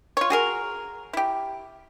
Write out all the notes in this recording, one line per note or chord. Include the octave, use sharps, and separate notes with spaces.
F4 C#5
F#4 G#4 A#4
E4 G4